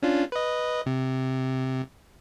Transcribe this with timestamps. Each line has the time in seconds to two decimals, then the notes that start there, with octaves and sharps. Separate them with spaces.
0.02 C#4 D4 F4
0.32 B4 D#5
0.86 C3